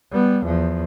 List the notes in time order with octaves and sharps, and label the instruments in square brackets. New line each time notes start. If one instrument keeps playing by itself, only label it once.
[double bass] G3 B3
E2 F3